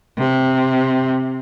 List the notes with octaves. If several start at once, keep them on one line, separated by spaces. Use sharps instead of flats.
C3